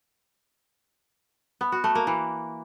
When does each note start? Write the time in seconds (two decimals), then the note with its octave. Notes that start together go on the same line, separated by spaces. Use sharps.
1.61 B3
1.72 F#4
1.84 A3
1.95 A#3
2.07 E3